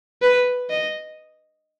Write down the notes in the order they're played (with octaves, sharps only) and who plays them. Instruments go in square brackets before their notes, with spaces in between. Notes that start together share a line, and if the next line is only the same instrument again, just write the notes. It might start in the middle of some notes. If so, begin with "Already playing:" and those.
[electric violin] B4
D#5